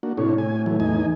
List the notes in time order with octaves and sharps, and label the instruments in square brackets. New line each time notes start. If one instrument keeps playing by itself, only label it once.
[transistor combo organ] A#3 D4 F#4
[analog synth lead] A2 [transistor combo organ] C3 D4 C#5
[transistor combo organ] G#5
E3 F#3 A3
E2 D#4 G#5